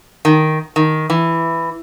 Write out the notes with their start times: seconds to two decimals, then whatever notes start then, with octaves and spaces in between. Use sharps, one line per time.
0.25 D#3
0.76 D#3
1.10 E3